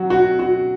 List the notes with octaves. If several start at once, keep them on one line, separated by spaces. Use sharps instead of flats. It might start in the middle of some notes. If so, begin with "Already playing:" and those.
Already playing: F#3 F#4
F#4
F#4